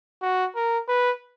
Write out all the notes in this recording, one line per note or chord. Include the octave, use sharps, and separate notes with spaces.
F#4
A#4
B4